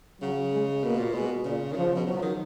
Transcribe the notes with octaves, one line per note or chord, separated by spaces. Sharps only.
C#3 F#3
G#3
B2 A#3
A#2
B2 G#3
A#2 C#3
D#3
C#3 F3
B2
C#3 F#3
F3
D#3